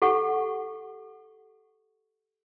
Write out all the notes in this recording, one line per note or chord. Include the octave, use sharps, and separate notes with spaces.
G4 A4 F#5 C#6